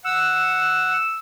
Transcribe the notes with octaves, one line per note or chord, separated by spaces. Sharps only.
F#5 E6